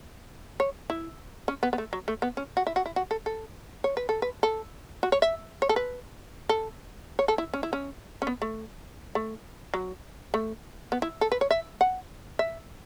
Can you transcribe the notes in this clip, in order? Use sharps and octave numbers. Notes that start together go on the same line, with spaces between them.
C#5
E4
C#4
B3
B3
A3
F#3
A3
B3
C#4
F#4
E4
F#4
E4
F#4
A4
A4
C#5
B4
A4
B4
A4
F#4
C#5
E5
C#5
A4
B4
A4
C#5
A4
E4
C#4
E4
C#4
C#4
B3
A3
A3
F#3
A3
B3
E4
A4
B4
C#5
E5
F#5
E5